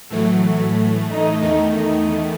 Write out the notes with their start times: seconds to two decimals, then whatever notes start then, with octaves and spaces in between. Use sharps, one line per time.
0.10 A2 E3 F#3 A3
1.09 D#4
1.42 E2 D#3 A3 D#4
1.75 D#4